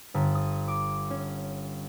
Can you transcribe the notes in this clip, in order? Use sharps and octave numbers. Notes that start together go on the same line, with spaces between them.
G1
D#6
D6
C#4